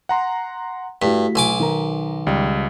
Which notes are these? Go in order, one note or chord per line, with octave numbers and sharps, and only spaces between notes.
F#5 A#5 C6
G2 A3 E4 F#4 B6
B1 G#5 D6
D#3 A#4 A#5
C#2 G3